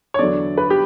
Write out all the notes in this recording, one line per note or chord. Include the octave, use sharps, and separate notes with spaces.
C#5
E2 D3 F#3 D5
B4
G4